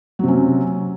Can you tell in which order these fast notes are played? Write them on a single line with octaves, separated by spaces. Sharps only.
F#3 C3 C#4